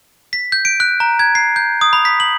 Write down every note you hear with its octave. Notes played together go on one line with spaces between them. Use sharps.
B6
G6
D7
F#6
A#5
G#6
C7
G6
D#6
B5
B6
F#7